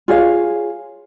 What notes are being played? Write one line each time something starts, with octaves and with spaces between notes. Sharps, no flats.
F4 G#4 C#5 F5